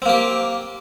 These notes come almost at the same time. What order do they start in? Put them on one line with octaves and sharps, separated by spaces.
C4 A#3 G4